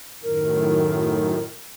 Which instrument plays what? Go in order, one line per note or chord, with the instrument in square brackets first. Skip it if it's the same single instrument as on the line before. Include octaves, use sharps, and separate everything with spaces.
[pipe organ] F#2 A2 D#3 [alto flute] A#4